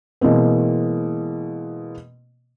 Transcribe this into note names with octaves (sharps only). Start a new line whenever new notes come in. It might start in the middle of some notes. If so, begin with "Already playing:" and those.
B2 E3 G#3 A#3 C4